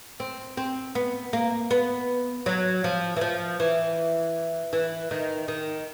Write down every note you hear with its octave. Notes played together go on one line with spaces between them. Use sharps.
C4
C4
B3
A#3
B3
F#3
F3
E3
F3
E3
E3
D#3
D#3